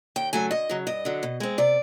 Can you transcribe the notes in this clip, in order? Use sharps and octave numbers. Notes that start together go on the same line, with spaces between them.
D#2 G5
C#3 F#3 A3 G#5
D2 D#5
C#3 F#3
G2 D#5
D3 F#3
B2
G#3 C4
C3 D5